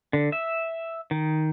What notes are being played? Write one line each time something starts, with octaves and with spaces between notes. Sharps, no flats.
D3
E5
D#3